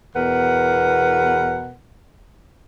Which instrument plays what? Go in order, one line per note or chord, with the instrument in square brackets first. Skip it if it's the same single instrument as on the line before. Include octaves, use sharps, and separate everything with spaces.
[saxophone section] E2 B2 A#4 B4 F#5